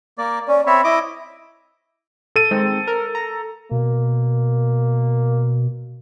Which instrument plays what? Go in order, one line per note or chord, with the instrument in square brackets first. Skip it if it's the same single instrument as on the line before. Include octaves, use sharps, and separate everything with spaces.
[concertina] A#3 D5
[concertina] C#4 [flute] D5
[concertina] C4 C#5 E5 [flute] B5
[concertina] E4 D#5 D6
[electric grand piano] A4 D#7
[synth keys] D#3 G#3 C4
A#4
A#5
[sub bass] B2 [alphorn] A#3